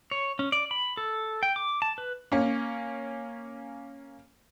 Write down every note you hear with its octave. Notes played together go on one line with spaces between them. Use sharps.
C#5
C#4
D5
B5
A4
G5
D6
A5
B4
A#3 C#4